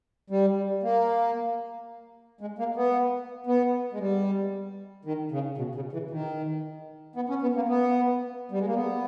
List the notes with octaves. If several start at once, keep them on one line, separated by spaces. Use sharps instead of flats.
G3
A#3
G#3
A#3
B3
B3
G#3
G3
D#3
C#3
B2
C#3
E3
D#3
B3
C#4
B3
A#3
B3
G3
G#3
A#3
B3